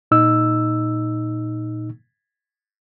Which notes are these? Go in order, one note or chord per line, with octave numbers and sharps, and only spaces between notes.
A#2 D#4 E6